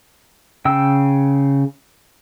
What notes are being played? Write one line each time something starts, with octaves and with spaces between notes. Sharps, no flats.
C#3 G5 E6